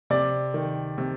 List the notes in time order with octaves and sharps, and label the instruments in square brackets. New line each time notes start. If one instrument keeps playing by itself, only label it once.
[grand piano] C3 D5
D#3
C3